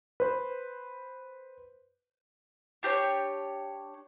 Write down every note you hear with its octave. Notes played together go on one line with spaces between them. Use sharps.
B4 C5
D4 G4 A#4 C#5